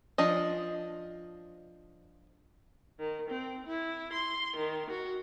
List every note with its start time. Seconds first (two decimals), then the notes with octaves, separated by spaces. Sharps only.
0.18 F3 D4 D#5
2.99 D#3
3.30 C4
3.66 E4
4.13 C6
4.56 D#3
4.90 F#4